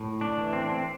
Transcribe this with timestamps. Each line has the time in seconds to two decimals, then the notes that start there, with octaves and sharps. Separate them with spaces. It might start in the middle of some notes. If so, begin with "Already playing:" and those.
Already playing: A2
0.21 D4
0.38 E3
0.53 C4
0.62 D4
0.69 C4